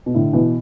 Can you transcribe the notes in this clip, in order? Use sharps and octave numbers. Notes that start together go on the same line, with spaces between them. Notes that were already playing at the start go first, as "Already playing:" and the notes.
B2
A2 D3
B2 E3